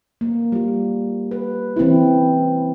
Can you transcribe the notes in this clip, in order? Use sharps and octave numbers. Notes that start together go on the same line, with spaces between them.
A#3
G3 F4
B4
E3 C4 C#4 E4